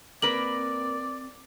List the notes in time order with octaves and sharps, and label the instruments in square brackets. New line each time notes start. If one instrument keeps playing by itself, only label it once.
[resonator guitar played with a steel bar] A#3 A#4 B4 [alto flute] C4 [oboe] D5 [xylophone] F#7